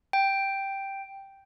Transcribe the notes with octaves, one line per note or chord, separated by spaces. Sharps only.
G5